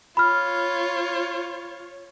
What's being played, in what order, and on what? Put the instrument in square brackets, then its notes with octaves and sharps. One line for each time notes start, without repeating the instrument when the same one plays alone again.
[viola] F4 C#5 [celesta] B5 F6